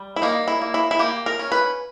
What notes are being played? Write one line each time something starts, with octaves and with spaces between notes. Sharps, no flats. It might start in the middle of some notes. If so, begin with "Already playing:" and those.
Already playing: G3
E4
A#3 D#4
E4
A#3
E4
E4
A#3 G4
A#4
C#4
B4